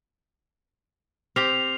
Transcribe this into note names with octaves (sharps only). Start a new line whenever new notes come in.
C4 G4 F6 C7 F7